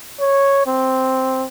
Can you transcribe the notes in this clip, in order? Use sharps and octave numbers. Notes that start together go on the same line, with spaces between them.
C#5
C4